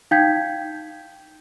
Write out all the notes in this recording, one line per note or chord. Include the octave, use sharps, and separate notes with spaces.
D#4 F5 G5 G6 G#6 B6